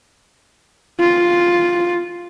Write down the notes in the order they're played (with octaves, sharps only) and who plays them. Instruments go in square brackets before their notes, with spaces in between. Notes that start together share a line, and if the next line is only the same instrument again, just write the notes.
[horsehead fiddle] F4